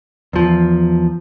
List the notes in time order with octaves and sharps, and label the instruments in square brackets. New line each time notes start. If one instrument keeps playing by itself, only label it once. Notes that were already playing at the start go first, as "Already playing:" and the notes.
[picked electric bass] E2 F3